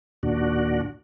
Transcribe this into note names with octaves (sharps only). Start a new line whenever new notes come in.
D#2 A#2 D4 F#4